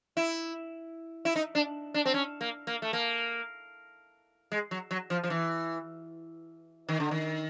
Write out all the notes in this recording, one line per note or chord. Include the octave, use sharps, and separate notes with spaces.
E4
E4
D#4
D4
D4
C4
C#4
A#3
A#3
A3
A#3
G#3
F#3
F#3
F3
F3
E3
D#3
D3
D#3